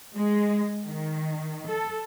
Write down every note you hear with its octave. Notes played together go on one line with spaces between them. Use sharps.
G#3
D#3
A4